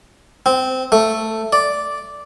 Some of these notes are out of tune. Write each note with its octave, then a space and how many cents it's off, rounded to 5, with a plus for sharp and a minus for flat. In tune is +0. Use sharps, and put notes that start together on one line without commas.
C4 -15
A3 +5
D5 -5